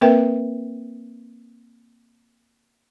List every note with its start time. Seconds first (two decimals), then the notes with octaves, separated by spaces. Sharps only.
0.01 A#3 C4 A#4 B4 E5 G5